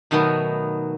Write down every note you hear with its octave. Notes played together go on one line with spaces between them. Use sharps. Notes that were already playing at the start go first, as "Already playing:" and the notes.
B2 D#3 F#3 A3 B3